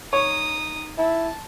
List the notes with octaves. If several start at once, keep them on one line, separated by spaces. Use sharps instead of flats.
D#4 C#5 D#6
E4 A5